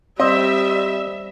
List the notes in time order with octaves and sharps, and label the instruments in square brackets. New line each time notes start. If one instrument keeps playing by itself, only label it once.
[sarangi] G3 [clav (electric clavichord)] C4 [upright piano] D#5 [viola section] E5